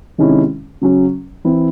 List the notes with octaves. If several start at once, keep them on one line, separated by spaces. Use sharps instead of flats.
C3 D#3 G#3 C#4 E4
C#3 F#3 C#4
E3 C4 E4